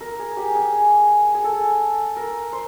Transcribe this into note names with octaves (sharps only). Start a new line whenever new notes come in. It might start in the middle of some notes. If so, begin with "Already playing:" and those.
A#4
G#4
G4
G#4
G#4
A4
A#4
C5